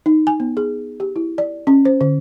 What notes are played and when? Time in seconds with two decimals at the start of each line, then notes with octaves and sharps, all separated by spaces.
0.06 D#4
0.27 G#5
0.40 B3
0.57 G#4
1.00 G4
1.16 E4
1.38 D5
1.67 C#4
1.85 C5
2.01 D3